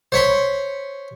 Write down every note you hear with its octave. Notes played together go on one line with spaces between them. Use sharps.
C5 C#5 B5 C6